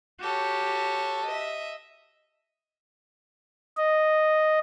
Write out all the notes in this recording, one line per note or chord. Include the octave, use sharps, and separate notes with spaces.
F#4 G4 A4 C#5
D#5 E5
D#5